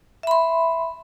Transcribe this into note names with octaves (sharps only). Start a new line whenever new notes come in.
E5 B5 C6